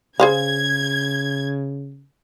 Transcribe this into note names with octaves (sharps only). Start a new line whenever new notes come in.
C#3 G#4 C5 F5 G#6